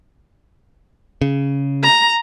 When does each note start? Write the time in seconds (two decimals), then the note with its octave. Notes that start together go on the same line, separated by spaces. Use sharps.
1.21 C#3
1.84 A#5